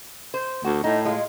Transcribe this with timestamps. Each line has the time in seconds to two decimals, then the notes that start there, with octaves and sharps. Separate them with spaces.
0.34 C5
0.65 D2 F#4
0.84 A2 D#4
1.05 G#3 F4